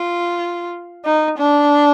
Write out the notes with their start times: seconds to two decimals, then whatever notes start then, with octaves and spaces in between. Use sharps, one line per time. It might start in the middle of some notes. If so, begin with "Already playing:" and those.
Already playing: F4
1.05 D#4
1.38 D4